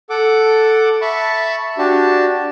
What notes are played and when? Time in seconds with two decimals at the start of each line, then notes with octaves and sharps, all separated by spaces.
0.10 A4 F#5 D6
1.01 E5 A5 B5 C#6
1.78 D4 F#4 G4 A5